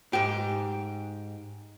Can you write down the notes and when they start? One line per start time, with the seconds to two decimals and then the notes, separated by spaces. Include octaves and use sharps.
0.13 G#2 G4